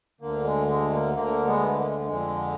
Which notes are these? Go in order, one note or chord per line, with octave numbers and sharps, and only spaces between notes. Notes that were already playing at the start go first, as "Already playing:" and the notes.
D2 D3 A#3
G#3
G#3
A#3
D2 D3 A#3
G#3 B3
A#3
G#3
F2 D3 G#3